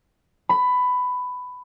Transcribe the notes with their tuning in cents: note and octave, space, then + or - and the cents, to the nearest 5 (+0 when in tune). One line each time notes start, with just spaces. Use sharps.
B5 +15